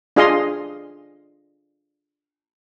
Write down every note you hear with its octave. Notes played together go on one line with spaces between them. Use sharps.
D4 F4 G#4 D#5 F5 C6